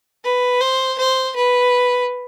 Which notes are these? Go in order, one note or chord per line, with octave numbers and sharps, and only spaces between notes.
B4
C5
C5
B4